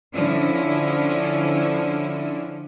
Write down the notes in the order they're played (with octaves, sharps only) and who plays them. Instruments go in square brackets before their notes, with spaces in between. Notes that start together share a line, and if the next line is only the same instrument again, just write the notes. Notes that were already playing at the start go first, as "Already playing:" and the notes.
[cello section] D3 F3 C#4 E4